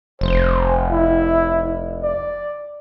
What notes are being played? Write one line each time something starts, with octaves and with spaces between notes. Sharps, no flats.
F1 C5
E4
D5